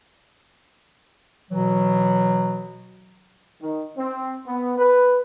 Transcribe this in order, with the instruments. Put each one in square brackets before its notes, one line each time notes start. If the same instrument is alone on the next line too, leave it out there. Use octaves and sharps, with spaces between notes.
[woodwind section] B2 E3 F#3
[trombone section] D#3
C4
B3
B4